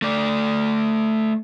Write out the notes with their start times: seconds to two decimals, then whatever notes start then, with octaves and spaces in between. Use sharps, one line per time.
0.02 A3 D5